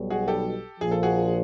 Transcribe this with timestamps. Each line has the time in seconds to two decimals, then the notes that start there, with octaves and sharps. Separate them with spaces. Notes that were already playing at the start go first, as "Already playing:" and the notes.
Already playing: B1 B2 G3
0.10 F#4 G#4
0.28 G4 A4
0.80 A#1 A#2 F3 G#4
0.91 A4
1.03 F#4 G#4